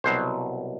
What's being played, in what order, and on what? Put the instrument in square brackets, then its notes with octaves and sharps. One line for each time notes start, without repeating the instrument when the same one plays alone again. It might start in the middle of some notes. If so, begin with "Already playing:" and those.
[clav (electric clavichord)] C2 B2 F#3 C5